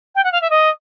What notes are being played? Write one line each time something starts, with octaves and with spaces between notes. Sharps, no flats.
G5
F#5
F5
E5
D#5